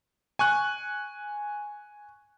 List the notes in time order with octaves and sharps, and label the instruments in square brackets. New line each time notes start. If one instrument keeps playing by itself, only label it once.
[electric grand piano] G#5 C#6 F#6